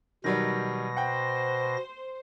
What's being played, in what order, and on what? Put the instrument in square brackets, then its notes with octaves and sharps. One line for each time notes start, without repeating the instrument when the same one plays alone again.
[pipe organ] B2 A#6 [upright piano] D#3 F#3 G3
[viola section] C5 [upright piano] F#5 G5